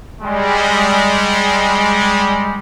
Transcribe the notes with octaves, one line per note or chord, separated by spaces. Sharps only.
G3 G#3